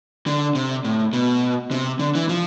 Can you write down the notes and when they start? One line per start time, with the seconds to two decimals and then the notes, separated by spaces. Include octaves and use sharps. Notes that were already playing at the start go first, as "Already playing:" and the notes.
0.27 D3
0.55 C3
0.85 A2
1.13 B2
1.71 C3
2.00 D3
2.15 E3
2.29 F3